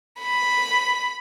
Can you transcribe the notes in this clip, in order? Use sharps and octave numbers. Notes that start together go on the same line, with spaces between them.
B5